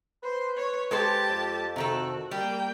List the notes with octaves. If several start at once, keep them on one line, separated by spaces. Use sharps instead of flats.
B4 C5
C#5
G#3 G4 A4 C5 A5
F2
C3 D#3 F#4 A4
G3 A#3 G5